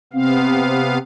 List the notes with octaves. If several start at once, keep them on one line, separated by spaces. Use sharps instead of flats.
C3 B3 C4 F5